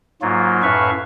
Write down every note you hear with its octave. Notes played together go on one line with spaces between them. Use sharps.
G#2 F#3 A#3 F4
F#2 A2 B4 E5 F5 C#6